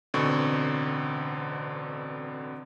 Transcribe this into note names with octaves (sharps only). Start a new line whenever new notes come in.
A1 B2 D3 C4 C#6